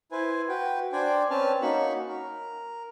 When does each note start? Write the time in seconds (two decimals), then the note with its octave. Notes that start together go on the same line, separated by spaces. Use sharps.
0.12 E4 B4 C5 G#5
0.49 F#4 B4 G5
0.92 D4 C5 D5 G5 G#5
1.30 C4 C#4 B4 A5 F6
1.62 A#3 C#4 D#4 F#4 B5 C#6
2.08 A#4